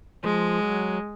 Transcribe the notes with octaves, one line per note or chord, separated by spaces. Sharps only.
F3 G#3
F#3